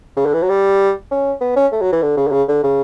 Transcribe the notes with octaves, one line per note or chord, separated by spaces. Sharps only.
C#3
D3
E3
F#3
G3
C#4
B3
C#4
A3
F#3
E3
D3
C#3
D3
C#3
D3
C#3